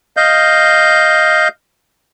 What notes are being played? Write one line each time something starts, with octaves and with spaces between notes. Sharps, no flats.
D#5 F5 G6